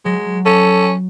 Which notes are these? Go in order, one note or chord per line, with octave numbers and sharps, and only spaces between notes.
F#3 G#3
C#4 A4